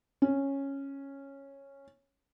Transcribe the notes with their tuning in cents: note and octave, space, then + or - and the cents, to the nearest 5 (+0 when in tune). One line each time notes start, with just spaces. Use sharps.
C#4 -10